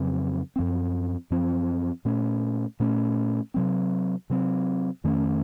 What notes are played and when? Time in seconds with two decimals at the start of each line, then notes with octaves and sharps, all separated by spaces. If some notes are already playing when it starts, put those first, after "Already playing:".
Already playing: F2 C#3 F#3 C4
0.56 F#2 F3 C4
1.31 F#2 F3 C4
2.05 A#2 A3 C#4
2.80 A#2 A3 C#4
3.54 C3 F#3 C4
4.30 C3 F#3 C4
5.04 F2 D#3 A3 C#4